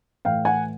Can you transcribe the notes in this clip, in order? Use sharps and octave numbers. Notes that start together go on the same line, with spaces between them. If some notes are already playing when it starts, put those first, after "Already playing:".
A2 E3 F5 G5
F#5 G#5